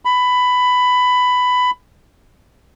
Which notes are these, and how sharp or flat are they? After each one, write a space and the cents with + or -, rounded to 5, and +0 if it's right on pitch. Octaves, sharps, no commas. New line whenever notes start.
B5 +15